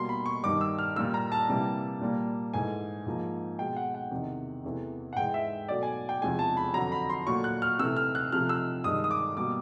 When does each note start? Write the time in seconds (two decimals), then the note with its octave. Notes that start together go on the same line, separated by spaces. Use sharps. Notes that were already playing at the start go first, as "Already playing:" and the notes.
Already playing: B2 G3 A#3 C6
0.09 B5
0.26 C#6
0.43 G2 D#3 G3 D6
0.61 E6
0.79 F6
0.96 A#2 G3 A#3 E6
1.14 A#5
1.32 A5
1.49 C3 E3 G3 A#3
2.01 A#2 G3 A#3
2.54 G#2 E3 A3 G#5
3.06 G#2 F3 A#3
3.59 B2 G#3 G5
3.76 F#5
3.95 F#5
4.11 E2 C3 D#3
4.64 E2 C3 E3 A3
5.13 F#5
5.16 G#2 E3 G#3 G5
5.34 E5
5.69 B2 F#3 A3 D5
5.83 G#5
6.09 G5
6.21 E2 C3 F3 G#3 G#5
6.39 A5
6.57 B5
6.74 F2 D3 F#3 A#5
6.92 B5
7.10 C6
7.27 A#2 F#3 A3 C#6
7.44 F#6
7.62 F6
7.79 C3 E3 A3 E6
7.97 F6
8.15 F#6
8.32 C3 F3 A3 F6
8.49 E6
8.84 G2 D#3 G#3 D#6
9.04 D#6
9.11 D6
9.37 B2 G3 A#3 D6